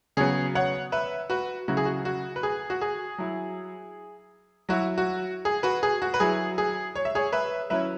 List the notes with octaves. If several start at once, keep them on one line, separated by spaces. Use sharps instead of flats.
C#3 F#3 B3 G#4 C#5
C#5 F#5
B4 E5
F#4 B4
C#3 F#3 E4 F#4
G#4
F#4
F#4
B4
G#4
F#4
G#4
F#3 E4
F#3 E4 F#4
F#4
G#4
F#4 B4
G#4
F#4
B4
F#3 E4 G#4
G#4
C#5
E5
G#4 C#5
B4 E5
F#3 C#4 E4 B4 E5